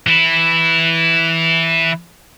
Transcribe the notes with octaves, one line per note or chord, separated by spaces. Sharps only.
E3 E4